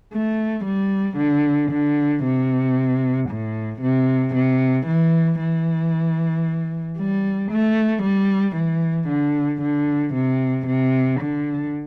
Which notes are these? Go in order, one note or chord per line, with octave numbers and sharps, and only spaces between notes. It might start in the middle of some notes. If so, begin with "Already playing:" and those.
A3
G3
D3
D3
C3
A2
C3
C3
E3
E3
G3
A3
G3
E3
D3
D3
C3
C3
D3